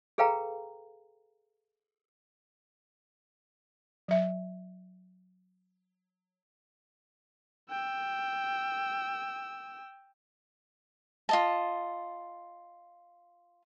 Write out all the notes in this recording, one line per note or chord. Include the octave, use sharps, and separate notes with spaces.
G#4 A4 B4 F5 G5 A#5
F#3 E5
G5 E6
F4 D#5 A5